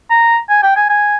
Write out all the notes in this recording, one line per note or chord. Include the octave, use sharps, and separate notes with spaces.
A#5
G#5
G5
G#5
G#5